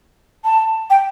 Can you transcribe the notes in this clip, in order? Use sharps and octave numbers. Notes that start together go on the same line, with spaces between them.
A5
G5